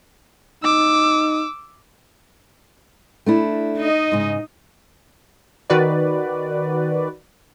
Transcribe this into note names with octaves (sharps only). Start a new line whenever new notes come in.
D#4 D6 E6
A3 D4 E4
D#4 D#5
G#2 C#3
D#3 F#4 B4 D5